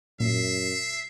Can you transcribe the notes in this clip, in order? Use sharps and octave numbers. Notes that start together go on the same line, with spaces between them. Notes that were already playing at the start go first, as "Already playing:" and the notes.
F#2 A#2 E5 C7